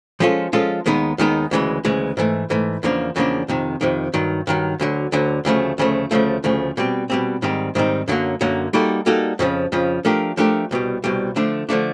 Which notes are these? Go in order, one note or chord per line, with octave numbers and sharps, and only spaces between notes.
F3 G#3 C#4 F4 A4
F3 G#3 C#4 F4 A4
D#2 D#3 G#3 B3 D#4
D#2 D#3 G#3 B3 D#4
D2 C#3 E3 G#3
D2 C#3 E3 G#3
G#2 E3 A3
G#2 E3 A3
E2 C#3 F3 A#3 D4
E2 C#3 F3 A#3 D4
F2 C3 D#3
F2 C3 D#3
G2 D#3 F#3
G2 D#3 F#3
D2 D3 F#3
D2 D3 F#3
D2 C#3 F3 A3
D2 C#3 F3 A3
D2 C#3 F3 A3
D2 C#3 F3 A3
B2 G3 C4
B2 G3 C4
G#2 D#3 G3 C4 D#4
G#2 D#3 G3 C4 D#4
F#2 D3 F#3 A#3
F#2 D3 F#3 A#3
G3 A#3 D#4 F#4 A4
G3 A#3 D#4 F#4 A4
F2 C#3 F3
F2 C#3 F3
F3 A3 D4 G4 A#4
F3 A3 D4 G4 A#4
C2 B2 G3
C2 B2 G3
D3 F3 A3 D4
D3 F3 A3 D4